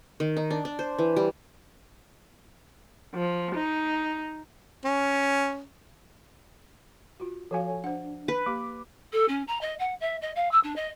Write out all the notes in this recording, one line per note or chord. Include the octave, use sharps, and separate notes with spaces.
D#3
D#4
D4
D4
C5
E3
G3
F3
D#4
C#4
F4 F#4
F3 F#4 A4 C#5 F5 G#5
D4 C5 F#5
B4
A#3 G4 D6
A4
C#4
A#5
D#5
F#5
E5
D#5
F5
E6
D4
D#5